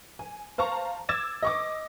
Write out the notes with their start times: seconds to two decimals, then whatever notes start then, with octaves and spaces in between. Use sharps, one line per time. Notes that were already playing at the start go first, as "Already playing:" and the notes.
0.19 G#5
0.58 C5 F5 A5 A#5 C#6
1.09 D6 E6 G#6 A6 E7
1.43 D#5 C#6 D6